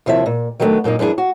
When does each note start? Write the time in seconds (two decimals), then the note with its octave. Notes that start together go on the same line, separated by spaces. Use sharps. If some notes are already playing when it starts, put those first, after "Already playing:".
0.06 D#2 C3 F3 E4 E5
0.26 A#2
0.60 D#3 F#3 G3 A3 B3 D4
0.84 F#2 A#2 A#3 D#4
0.99 F#2 E3 D4 E4 G#4
1.18 F#4